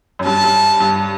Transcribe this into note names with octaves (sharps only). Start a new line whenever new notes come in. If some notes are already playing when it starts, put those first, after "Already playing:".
F#2
G2 A5
G2
G2